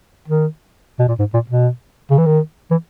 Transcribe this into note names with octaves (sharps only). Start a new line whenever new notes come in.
D#3
B2
A#2
G#2
A#2
B2
C#3
E3
D#3
E3